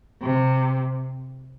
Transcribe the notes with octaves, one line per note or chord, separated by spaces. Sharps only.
C3